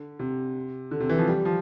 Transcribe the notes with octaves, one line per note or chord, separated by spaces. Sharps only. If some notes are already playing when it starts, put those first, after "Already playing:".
Already playing: D3
C3
D3
C3
E3
F3
G3
F3